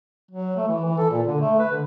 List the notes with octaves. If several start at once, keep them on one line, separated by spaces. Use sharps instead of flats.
F#3
A3
E3
E3
A4
A#2
D3
A3
B4
D3